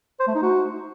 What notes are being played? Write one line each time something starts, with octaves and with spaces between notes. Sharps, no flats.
C5
A3
D#4
F#4